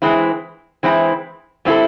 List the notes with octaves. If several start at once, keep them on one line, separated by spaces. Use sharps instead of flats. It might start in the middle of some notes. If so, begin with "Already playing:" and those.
E3 G#3 C4 E4
E3 G#3 C4 E4
G3 C4 E4 A4